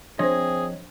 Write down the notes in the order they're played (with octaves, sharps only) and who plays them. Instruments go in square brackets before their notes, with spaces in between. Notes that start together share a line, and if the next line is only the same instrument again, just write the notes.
[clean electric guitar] F3 C#5 D#5 [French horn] C4 [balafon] D4 C5 [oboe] G#4